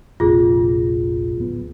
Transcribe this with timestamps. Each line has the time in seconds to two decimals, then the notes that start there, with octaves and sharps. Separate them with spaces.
0.20 F1 A#1 C3 F4 G#4
1.37 D1 B3